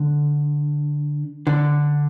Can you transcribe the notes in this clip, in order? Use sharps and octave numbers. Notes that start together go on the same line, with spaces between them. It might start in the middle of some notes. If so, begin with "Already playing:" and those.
Already playing: D3
D3